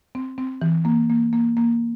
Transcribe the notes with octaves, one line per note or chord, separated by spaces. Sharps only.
C4
C4
E3
A#3
A#3
A#3
A#3